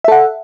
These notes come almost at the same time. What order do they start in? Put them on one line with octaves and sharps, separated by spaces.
E5 A4 F#5